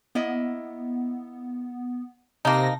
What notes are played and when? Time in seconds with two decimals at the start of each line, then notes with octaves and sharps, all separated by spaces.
0.15 A#3 B3 E4 D#5
2.45 C3 A#3 D#4 A5 A#6